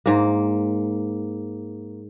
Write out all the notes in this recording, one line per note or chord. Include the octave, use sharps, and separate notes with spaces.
G#2 A#3